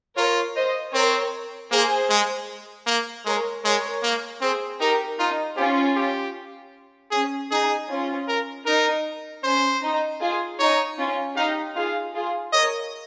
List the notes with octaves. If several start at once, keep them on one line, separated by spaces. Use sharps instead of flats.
F4 A#4 C#5
C5 D#5
C4 A#4 C#5
A#3 G#4 C5
G#3
A#3
G#3 A#4 C#5
G#3 A#4 C#5
A#3
C4 G#4 C5
D#4 G4 A#4
D#4 F4
C#4 F4 G4
G4
C#4 G#4
D#4 G#4
C#4 F4
A#4
D#4 A#4
C#4 C5
D#4
F4 G#4
D#4 C#5
C#4 F4
D#4 G4 F5
F4 G#4 F5
F4 G#4
A#4 C#5 D#5